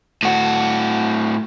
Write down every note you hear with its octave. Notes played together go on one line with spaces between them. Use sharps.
A2 F#4